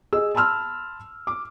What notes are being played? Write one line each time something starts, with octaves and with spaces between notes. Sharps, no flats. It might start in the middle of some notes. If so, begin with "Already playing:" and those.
G#4 D#5 E6
A5 B5 C6 E6 F6
D6